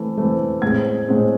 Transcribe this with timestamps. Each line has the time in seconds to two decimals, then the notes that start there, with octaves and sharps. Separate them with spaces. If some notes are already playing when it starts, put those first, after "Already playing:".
Already playing: E3 A3 C4
0.17 E3 A3 C4
0.62 A2 G#3 C4 G#6
1.07 A2 G#3 C4